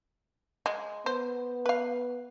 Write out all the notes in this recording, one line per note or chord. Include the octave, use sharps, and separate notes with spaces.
G#3
B3 C5
B4 F5